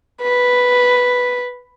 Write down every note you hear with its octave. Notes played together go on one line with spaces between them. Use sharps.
B4